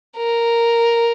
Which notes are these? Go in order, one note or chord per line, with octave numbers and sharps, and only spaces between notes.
A#4